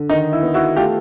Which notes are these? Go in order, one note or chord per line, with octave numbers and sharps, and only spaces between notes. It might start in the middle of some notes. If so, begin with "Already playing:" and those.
Already playing: D3
D#3 D#4
E4
B3
E4 F#4
A3 F4 G4